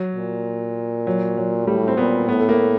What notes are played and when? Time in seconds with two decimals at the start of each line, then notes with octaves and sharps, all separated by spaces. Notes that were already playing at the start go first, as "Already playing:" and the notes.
Already playing: F#3
0.15 A#2
1.07 F#3
1.37 F#3
1.67 A2 G3
1.88 C4
1.97 A#2 B3
2.28 A2 B3
2.39 A3
2.49 A#3